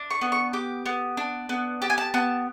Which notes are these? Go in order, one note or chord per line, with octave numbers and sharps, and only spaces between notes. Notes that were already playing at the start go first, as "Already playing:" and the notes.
Already playing: D4
C#6
B3
C#6
G4 D6
B3
D4
B3
G4 A5
G#5
A5
B3 A5